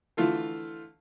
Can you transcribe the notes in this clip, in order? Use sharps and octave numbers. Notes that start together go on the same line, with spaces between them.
D3 E3 A3 F4 A4